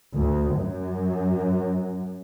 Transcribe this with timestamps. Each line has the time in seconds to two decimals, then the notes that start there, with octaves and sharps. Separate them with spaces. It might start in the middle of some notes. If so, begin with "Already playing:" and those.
0.13 D2
0.54 F#2